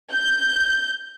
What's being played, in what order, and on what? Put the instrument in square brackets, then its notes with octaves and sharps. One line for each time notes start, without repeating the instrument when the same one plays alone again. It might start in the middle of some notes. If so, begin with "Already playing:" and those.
[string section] G6